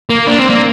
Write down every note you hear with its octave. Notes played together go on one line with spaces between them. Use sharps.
A#3
D4
C4
A#3